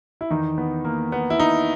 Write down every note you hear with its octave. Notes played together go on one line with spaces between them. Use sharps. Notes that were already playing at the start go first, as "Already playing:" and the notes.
E4
E2 D#3 D#4
B3
A#3
B3
E4
D#4